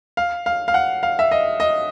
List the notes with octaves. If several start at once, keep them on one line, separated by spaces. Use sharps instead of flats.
F5
F5
F5
F#5
F5
E5
D#5
D#5